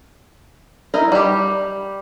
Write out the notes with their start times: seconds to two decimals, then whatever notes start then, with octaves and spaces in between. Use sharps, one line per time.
0.94 D#4 E4 A#4
1.12 G3 G4